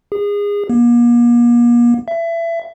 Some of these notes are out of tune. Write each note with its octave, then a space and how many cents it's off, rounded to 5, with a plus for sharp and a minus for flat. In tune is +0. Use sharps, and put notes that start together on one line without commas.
G#4 -25
A#3 +40
E5 +25